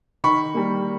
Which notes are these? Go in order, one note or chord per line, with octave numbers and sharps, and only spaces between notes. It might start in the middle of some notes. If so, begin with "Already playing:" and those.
D#3 B5 C#6
G3 A#3